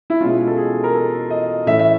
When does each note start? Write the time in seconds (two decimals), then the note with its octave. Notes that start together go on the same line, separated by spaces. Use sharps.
0.10 E4
0.21 B2 G#3 C#4 F4
0.47 A4
0.57 G#4
0.84 A#4
0.94 A4
1.30 D#5
1.66 A2 E3 A3 C#4 E5
1.79 E5